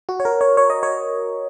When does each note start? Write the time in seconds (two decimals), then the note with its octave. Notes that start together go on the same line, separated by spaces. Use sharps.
0.09 F#4
0.20 C#5
0.25 A#4
0.41 C#5
0.57 C#5
0.70 D#5
0.83 C#5